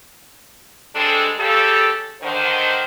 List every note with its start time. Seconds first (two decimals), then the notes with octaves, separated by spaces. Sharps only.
0.95 G3 G#3 C4 D4 A4
1.38 C#3 G4 A4
2.22 D3 D#3 C5